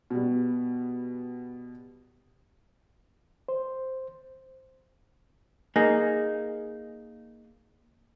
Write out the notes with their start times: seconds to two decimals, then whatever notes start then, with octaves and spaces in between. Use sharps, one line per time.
0.10 B2 G3
3.49 C5
5.76 A#3 D#4 G#4